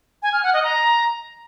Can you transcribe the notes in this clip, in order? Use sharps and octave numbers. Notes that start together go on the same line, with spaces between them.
G#5
F6
F#5
D#5
A#5